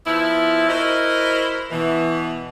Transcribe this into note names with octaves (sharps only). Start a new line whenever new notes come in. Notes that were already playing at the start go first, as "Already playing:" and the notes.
F3 B3 E4
E4 F#4 A#4 C5 D#5
B2 E3